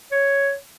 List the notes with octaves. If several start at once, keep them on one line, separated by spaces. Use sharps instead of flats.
C#5